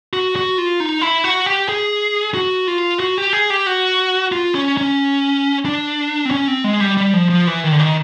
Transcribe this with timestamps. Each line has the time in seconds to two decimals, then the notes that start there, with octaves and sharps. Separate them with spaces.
0.13 F#4
0.36 F#4
0.58 F4
0.80 D#4
1.01 E4
1.24 F#4
1.46 G4
1.69 G#4
2.34 F#4
2.67 F4
3.00 F#4
3.18 G4
3.33 G#4
3.50 G4
3.66 F#4
4.32 F4
4.55 C#4
4.77 C#4
5.65 D4
6.25 C4
6.31 C#4
6.48 C4
6.64 G#3
6.80 G3
6.97 G3
7.13 F3
7.30 F3
7.47 E3
7.64 D#3
7.72 D3
7.80 D#3